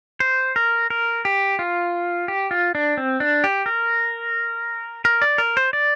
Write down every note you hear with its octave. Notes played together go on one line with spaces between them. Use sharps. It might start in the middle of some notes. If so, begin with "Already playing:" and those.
C5
A#4
A#4
G4
F4
G4
F4
D4
C4
D4
G4
A#4
A#4
D5
A#4
C5
D5